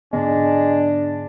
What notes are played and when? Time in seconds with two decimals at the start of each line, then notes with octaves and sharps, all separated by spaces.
0.13 G#2 D3 G#3 B3 D4